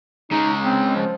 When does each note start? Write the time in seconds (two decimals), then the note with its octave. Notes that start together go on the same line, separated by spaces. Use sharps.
0.31 C#3 G#3 D#4
0.65 C4
0.96 F3